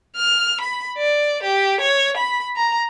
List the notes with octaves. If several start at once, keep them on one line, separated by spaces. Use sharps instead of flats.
F6
B5
D5
G4
C#5
B5
A#5